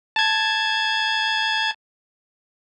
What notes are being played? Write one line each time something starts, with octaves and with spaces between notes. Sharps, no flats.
A5 G#6